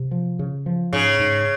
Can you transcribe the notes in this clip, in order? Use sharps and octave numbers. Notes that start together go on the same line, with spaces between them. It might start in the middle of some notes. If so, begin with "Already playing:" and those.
Already playing: C3
F3
C#3
F3
G#2 C#3
G#2